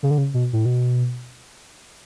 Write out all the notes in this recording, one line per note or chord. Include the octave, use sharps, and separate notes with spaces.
C#3
D3
C#3
B2
A2
B2